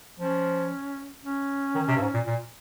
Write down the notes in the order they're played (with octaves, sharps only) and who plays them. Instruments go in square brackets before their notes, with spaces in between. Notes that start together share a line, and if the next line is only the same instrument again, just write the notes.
[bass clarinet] F3 [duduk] C#4
[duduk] C#4
[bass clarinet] D#3
C3
G2
G#2
A#2
A#2